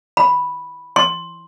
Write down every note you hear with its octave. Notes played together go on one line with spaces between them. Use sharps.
B5
C6